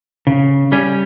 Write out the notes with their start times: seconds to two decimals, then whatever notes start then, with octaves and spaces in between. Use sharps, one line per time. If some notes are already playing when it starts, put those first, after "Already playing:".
0.27 C#3
0.72 G3 C#4